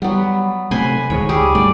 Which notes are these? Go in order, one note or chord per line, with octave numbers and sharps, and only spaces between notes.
F#3 G3 B3
C3 A3 B4 C5 G#5
D1 D#3 G#3 C#5
C#2 G3 G4 G#4
G2 G3 A3 D5